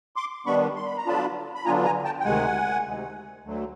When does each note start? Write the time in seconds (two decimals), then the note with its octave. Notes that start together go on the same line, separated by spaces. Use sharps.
0.16 C6 D6
0.46 D#3 G3 B3 D4 B5 C#6
0.76 C6
0.86 B5
0.97 A#5
1.06 D3 F#3 B3 D4 F4 A5 B5
1.55 B5
1.65 D3 F#3 B3 D4 F4 G#5 A#5
1.85 G#5 A#5
2.04 G5 A5
2.20 G5
2.25 D2 C3 D#3 G#3 F#5 G#5
2.85 D2 C3 D#3 G#3
3.44 D2 D3 F#3 A3